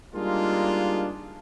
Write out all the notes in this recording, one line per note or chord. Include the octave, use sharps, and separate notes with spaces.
G3 G#3 A#3 D4 D#4 F4